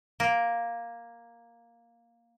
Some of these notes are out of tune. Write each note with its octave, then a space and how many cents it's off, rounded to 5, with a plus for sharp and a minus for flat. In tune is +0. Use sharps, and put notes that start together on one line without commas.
A#3 +5